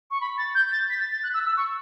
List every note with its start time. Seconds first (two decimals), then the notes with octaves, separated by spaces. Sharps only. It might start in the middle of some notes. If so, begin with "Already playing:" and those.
0.11 C#6
0.21 B5
0.38 A6
0.55 G6
0.72 A6
0.90 B6
1.00 A6
1.12 A6
1.23 F#6
1.34 E6
1.46 E6
1.57 C#6